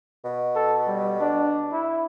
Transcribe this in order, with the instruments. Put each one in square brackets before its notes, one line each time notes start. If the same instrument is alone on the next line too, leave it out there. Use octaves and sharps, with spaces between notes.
[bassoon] B2
[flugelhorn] A4
G3
D4
E4